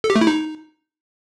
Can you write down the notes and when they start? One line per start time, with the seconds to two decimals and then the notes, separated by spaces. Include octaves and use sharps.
0.04 A4
0.10 G4
0.16 A3
0.21 E4
0.27 D#4